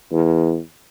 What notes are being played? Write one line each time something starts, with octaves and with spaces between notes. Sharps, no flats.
E2